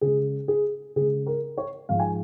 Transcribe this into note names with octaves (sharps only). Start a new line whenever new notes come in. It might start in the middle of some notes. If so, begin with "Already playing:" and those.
C#3 G#3 G#4
G#4
C#3 G#3 G#4
A#4
C#5
G#2 F3 G#3 F5
G#5